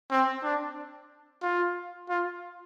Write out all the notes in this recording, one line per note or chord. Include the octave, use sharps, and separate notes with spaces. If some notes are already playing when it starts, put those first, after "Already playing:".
C4
D4
F4
F4